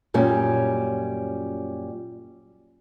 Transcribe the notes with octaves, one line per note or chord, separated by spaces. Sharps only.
F#2 A#2 G3 C#4